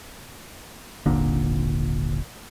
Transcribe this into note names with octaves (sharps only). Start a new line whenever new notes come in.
D#1 G#1 A#2 D3